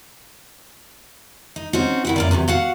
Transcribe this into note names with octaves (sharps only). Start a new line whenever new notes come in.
D#4
C4 C#4 D#4 F#4
D#3 E4 F#5
F#2 A#3 D5
E2 G2 C3 F#3
F#4 F5 F#5